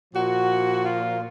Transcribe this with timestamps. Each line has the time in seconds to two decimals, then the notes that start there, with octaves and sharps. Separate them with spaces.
0.13 A#2 F3 F#4
0.83 F4